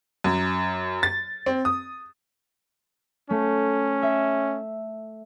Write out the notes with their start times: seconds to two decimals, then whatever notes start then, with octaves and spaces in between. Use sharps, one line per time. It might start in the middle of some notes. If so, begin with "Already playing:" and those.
0.24 F#2
1.03 A6
1.46 C4
1.65 D#6
3.30 A3 C#4
4.02 E5